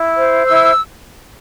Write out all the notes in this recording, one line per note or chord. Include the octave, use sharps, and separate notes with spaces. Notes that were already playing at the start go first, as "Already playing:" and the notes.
Already playing: E4
C5
E4 E6